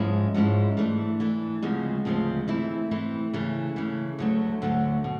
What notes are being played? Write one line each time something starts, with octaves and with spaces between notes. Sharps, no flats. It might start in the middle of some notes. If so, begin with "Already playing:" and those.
Already playing: G#2 F3 G#3 C#4 E4
G#2 F3 G#3 C#4 E4
E3 A3 D4
E3 A3 D4
D2 C#3 F3 G#3 C4
D2 C#3 F3 G#3 C4
E3 A3 C4 E4
E3 A3 C4 E4
C#3 E3 A3
C#3 E3 A3
D2 D3 F#3 A3
D2 D3 F#3 A3
B2